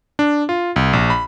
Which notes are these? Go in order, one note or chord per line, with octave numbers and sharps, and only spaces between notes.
D4
F4
C2
A#1
B5